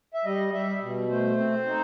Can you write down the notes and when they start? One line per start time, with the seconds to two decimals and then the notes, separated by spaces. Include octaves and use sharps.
0.14 E5
0.25 G3 D#5
0.53 G3 E5
0.82 B2
1.09 A3 C5
1.37 C4
1.66 D#4